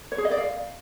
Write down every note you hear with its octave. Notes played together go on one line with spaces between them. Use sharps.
C#5
G#4
D#5
D5
F5